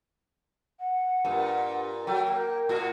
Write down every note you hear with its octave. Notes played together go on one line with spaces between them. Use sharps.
F#5
G2 A#2
F#3 A3 G5
A#3
A2 F#4